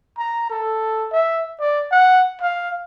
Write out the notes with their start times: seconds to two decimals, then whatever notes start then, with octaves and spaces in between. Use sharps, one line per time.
0.18 A#5
0.50 A4
1.12 E5
1.60 D5
1.92 F#5
2.41 F5